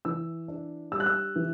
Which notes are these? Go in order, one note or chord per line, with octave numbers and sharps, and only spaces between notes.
E3 E6
D4
G3 E6
F#6
E6
E3